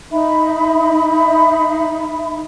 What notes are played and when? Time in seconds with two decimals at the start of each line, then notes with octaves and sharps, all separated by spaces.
0.11 D#4 E5 B5